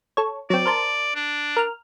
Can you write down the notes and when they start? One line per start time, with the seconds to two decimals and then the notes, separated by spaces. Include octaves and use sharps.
0.17 A4 C#5
0.50 F#3 C4 D5
0.66 A#4 C5 A5
1.15 D4
1.57 A#4 F6